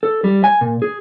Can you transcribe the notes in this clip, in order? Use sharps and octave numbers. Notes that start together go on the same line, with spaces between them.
A4
G3
G#5
A#2
G#4